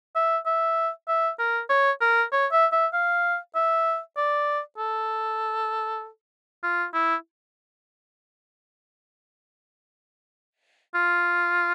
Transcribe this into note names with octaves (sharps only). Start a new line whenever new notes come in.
E5
E5
E5
A#4
C#5
A#4
C#5
E5
E5
F5
E5
D5
A4
F4
E4
F4